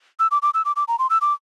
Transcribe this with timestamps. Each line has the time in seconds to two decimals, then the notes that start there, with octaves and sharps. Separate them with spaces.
0.19 E6
0.31 D6
0.42 D6
0.54 E6
0.65 D6
0.76 D6
0.88 A#5
0.99 C6
1.10 E6
1.21 D6